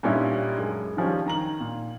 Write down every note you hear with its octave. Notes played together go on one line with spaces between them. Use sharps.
G2 A#2 G3 C#4 D#4 E4
F#2 G#3
D#3 F3 G3 C#4
D#3 A#5 F#7
A#2